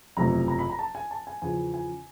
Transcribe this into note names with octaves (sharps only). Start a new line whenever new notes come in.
F#1 E2 C3 F3 A3 A#5
A#5
B5
A#5
A5
G#5
A5
G#5
E2 C#3 F3 G#5
G#5